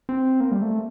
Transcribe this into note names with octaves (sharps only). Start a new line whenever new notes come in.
C4
A#3
G3
A3